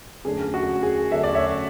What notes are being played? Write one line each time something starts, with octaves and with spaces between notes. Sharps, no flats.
F#2 D3 A3 D4 G#4
F#4
G#4
F#2 D3 A3 D4 E5
D5
C#5 E5